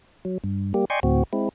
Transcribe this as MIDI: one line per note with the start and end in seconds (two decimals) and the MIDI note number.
0.25 0.38 54
0.44 0.73 43
0.74 0.85 55
0.74 0.85 58
0.74 0.85 67
0.90 1.00 74
0.90 1.00 75
0.90 1.00 79
0.90 1.00 80
0.90 1.00 84
0.90 1.00 85
1.03 1.23 38
1.03 1.23 45
1.03 1.23 60
1.03 1.23 66
1.33 1.49 56
1.33 1.49 60
1.33 1.49 64